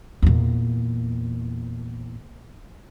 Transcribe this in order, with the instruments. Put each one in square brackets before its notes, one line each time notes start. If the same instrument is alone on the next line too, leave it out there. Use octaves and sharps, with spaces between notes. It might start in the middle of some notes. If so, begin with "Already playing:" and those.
[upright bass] E2 A#2